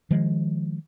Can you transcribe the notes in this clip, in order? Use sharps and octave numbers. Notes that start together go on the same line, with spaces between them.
D#3 F3 G#3